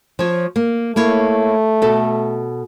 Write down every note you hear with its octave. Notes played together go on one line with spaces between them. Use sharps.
F3 C#5
A#3
A3 A#3 E4 C#5
B2 A4